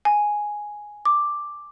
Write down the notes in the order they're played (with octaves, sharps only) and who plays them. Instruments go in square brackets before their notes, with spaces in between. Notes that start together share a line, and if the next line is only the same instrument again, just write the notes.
[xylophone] G#5
D6